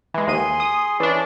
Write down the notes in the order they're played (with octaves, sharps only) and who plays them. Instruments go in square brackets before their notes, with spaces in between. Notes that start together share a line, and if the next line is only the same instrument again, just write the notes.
[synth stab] E3 G#3
[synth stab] D#2 D#7 [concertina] G#4 C6
[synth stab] D#6
[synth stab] E3 D4 [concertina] C#4 D5